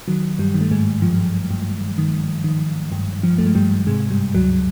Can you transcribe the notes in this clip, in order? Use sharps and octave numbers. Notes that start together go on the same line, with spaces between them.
D#3 F#3
G2 G3
D#3
A3
G#2 G#3
G2 F3
G2
D#3
D#3
G2
F3
G2 A3
G#3
G2 G3
G#2 C3 G#3
G2 G3
D2 F#3